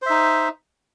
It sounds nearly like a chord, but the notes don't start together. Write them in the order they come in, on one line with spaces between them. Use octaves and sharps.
C5 E5 D#4